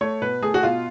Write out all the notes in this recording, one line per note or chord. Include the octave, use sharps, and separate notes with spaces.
A3 C#5
B2 B4
A3 G#4
F#4
B2 F4